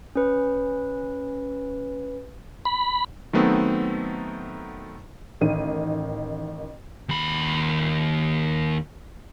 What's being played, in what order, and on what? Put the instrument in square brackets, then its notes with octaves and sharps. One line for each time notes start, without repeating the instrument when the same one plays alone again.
[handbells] C#4 B4
[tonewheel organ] B5
[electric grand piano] D#3 F#3 A3 B3 C4 D#4
[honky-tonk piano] A1 D#3 D#7
[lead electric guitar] D#2 B5